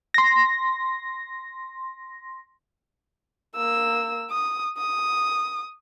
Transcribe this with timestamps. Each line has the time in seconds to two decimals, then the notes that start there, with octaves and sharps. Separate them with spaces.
0.14 C6 A#6
3.56 A#3 E6
4.31 D#6
4.78 D#6